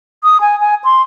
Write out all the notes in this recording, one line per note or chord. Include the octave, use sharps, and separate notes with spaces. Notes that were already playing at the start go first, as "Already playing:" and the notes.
D#6
G#5
G#5
C6